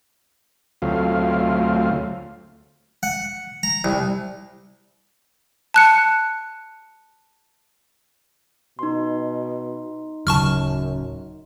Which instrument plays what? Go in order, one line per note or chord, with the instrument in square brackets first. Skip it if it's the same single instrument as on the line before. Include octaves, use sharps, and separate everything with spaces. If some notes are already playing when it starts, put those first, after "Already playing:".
[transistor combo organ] D2 F#3 A3 C4 F4 F5
[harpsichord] F#5
A#5
C2
[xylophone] A5 F#6 C#7
[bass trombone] B2 [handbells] D#4 C6
[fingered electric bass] D1 C#3 F#3 [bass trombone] F#2 [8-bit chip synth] A5 C#6 F6